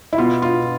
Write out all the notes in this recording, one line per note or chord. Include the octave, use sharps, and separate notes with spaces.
E4
B2 F4
F4